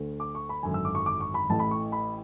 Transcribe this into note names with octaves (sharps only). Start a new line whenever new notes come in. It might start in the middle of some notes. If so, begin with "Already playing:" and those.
Already playing: D2 D3
D6
C#6
B5
G#1 F#2 D3 G#5
E6
D6
C#6
D6
C#6
B5
A1 A2 E3 A5
B5
C#6
B5